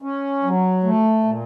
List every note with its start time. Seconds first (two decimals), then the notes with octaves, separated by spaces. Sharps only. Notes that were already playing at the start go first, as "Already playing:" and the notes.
0.02 C#4
0.43 F#3
0.84 A3
1.24 A#2